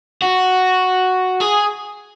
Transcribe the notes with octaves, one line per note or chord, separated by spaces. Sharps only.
F#4
G#4